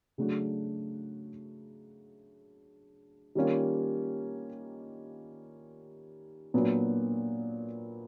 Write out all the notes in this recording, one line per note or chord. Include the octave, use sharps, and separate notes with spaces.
C#3 F#3 A3 D4 F#4
D#3 G3 A#3 C#4 F4
A#2 F#3 B3 D4